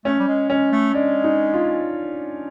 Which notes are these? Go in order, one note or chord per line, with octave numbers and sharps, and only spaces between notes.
A3 C#4
G3
G#3
G#3 C#4
A3
G#3 D4
D#4
F4